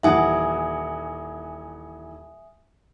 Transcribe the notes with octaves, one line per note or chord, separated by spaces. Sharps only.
D#1 E3 E5 F#5 G#5 D#6